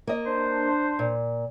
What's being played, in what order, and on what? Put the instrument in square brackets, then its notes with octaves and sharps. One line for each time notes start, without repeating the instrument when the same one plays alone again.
[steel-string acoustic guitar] A#3 D#5
[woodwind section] D4 C5
[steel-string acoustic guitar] A#2